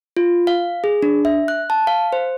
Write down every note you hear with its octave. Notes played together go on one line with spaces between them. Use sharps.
F4
F5
G#4
D4
E5
F#6
A5
F5
C5